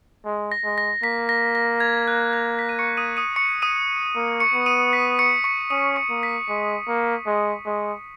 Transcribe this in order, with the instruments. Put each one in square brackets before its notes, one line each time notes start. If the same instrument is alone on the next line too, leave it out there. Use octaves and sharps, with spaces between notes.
[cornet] G#3
[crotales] A#6
[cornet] G#3
[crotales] A#6
[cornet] A#3 [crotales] B6
[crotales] A#6
A#6
G#6
F#6
G#6
B6
D#7
C#6 C#7
D#6 D#7
D#6 D#7
C#6 C#7
D#6 D#7
[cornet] A#3
[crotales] C#6 C#7
[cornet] B3
[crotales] D#6 D#7
B6
C#6 C#7
C#6 C#7
[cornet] C#4 [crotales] D#6 D#7
[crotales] C#6 C#7
[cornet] A#3
[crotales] B6
[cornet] G#3
A#3
G#3
G#3